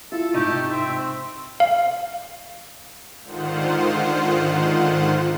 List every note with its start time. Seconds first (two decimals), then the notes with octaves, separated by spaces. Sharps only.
0.12 E4 F4 A4
0.34 G#2 C3 A3 D#4 G4
0.71 C4 E5
1.60 F5
3.22 G#2 D3 D#3 F4 C5 F#5